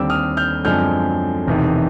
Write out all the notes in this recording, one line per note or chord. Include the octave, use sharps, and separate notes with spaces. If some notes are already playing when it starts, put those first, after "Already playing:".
Already playing: D#2 D3 G3 C4 D6 E6
D#6 F6
F6 G6
F#2 D3 F3 G#3 C4 F6 G6
E1 E2 C3 D#3